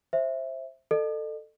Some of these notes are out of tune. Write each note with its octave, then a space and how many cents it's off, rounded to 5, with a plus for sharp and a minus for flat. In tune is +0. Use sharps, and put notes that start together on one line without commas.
C5 +15 E5 +0
A4 +15 D#5 -45